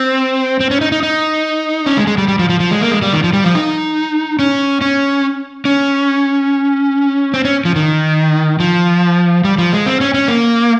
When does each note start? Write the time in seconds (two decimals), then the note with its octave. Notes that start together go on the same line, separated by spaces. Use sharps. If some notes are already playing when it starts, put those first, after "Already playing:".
Already playing: C4
0.60 C4
0.71 C#4
0.81 D#4
0.92 D#4
1.03 D#4
1.86 C#4
1.97 G#3
2.07 G#3
2.18 G3
2.28 G3
2.39 F3
2.49 F3
2.60 F3
2.71 G#3
2.81 A#3
2.92 G#3
3.02 G3
3.13 D#3
3.24 F3
3.33 G3
3.44 F3
3.55 D#4
4.39 C#4
4.81 C#4
5.65 C#4
7.34 C4
7.45 C#4
7.65 F3
7.76 D#3
8.60 F3
9.44 G3
9.58 F3
9.73 G#3
9.86 C4
10.01 C#4
10.14 C#4
10.28 A#3